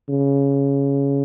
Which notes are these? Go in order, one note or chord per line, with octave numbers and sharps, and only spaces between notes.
C#3